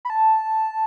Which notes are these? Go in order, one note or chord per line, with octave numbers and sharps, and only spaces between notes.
B5
A5